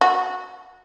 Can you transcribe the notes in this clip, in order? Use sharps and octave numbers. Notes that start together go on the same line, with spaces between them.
F#4